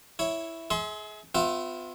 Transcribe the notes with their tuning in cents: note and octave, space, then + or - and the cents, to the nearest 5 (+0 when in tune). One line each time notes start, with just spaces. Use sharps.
E4 +0 C#5 +0
G#4 +25 E5 -40 C6 +0
B3 +45 F4 +30 E5 +0